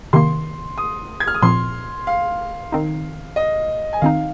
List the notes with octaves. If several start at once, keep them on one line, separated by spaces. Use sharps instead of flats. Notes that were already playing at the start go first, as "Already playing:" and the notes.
C3 D#3 A#3 C6
D#6
G#6
F6
D#6
A#2 F3 C4 C6
F5
D#3 C4 D#4
D#5
G#5
D#3 C4 D#4 F5